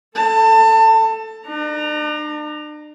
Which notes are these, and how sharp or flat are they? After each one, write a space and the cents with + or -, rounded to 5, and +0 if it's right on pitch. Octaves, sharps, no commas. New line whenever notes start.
A4 +0 A5 +25
D4 +40 A#5 +0